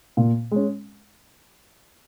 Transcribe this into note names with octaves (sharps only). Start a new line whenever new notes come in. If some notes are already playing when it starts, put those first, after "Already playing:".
A#2
G#3 C#4